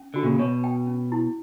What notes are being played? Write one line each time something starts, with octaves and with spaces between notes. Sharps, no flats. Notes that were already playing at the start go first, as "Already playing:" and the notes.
Already playing: C#4
D3 F#4
A#2 C#3
B2 C#5
G5
C#4
E4